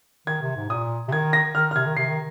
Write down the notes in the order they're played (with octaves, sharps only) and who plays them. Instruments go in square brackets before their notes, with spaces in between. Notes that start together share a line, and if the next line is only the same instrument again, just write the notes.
[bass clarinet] D#3 [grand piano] G#6
[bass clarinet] C3
G#2
[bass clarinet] A#2 [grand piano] D#6
[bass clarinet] C3
[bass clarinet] D#3 [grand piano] G#6
[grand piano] A#6
[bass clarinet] D#3 [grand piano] F6
[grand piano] F6
[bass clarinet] C3 [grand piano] G#6
[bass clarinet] D#3
[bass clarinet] C3 [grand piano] C7
[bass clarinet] D#3